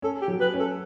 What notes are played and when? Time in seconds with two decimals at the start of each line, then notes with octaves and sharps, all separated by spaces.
0.02 C#4 A4
0.22 G4
0.28 F#3
0.40 B4
0.54 C#4
0.59 A4